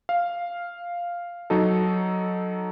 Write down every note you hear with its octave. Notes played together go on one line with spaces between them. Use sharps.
F5
F#3 D#4 A4